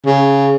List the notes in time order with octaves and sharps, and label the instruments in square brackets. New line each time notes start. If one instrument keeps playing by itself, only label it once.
[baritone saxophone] C#3